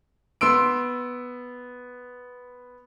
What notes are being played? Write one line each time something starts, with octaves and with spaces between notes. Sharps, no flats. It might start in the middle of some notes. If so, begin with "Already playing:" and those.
B3 C6 E6 D7